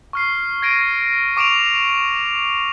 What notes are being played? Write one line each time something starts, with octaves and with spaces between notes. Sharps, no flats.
C#6 F6 C7
G#6 A#6 D7 D#7
C#6 D6 D7 E7 F7